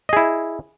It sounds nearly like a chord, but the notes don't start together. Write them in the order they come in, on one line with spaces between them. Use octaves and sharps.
D#5 G#4 E4